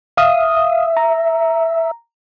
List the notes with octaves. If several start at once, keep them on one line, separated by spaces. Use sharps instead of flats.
E5 F5 D#6
A#5